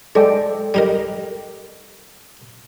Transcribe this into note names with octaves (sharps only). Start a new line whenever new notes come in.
G#3 A4 D5 G5
G3 D#4 A#4